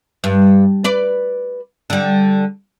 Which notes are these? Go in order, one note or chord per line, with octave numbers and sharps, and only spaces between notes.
G2
B4 D5
D3 G3